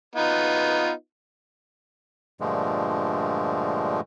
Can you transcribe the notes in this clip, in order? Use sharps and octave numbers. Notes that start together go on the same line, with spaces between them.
B3 D#4 F4
G2 A#2 D3 F3 G#3 A3